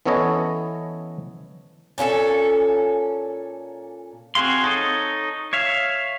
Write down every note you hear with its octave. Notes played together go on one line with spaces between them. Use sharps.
E3 B3 C#4 A4 C#5 D#5
A#2 C#4 F4 A4
C4 F#4 G#4 F5 C6
D#4 A4 C#5 D#5
C#5 E5 F5